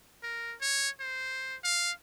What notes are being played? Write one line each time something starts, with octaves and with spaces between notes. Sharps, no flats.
A#4
C#5
C5
F5